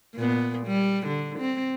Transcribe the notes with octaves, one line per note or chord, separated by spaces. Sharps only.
A#2 B3
G3
D3
C4